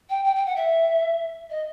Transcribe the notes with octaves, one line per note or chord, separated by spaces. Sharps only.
G5
G5
G5
F#5
E5
D#5